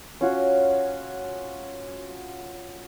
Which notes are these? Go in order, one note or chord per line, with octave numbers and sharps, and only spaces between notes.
C#4 F4 F#4